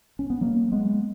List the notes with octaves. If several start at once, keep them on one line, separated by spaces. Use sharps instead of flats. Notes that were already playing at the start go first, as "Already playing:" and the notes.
C#4
B3
F#3 A#3
G#3 B3